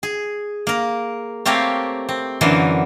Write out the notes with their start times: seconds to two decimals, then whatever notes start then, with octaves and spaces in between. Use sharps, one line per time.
0.03 G#4
0.67 A#3 A#4
1.46 A3 A#3 C4 G4 C#5 F5
2.09 C4
2.41 F#2 D3 E3 A#3 F#4 C6